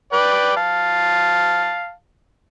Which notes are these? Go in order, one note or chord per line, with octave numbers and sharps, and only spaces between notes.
B4 D5 G5
F5 A5